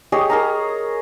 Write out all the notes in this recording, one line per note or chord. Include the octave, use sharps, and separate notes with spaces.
G4 G#4 C#5 D#5
G#4 A#4 A#5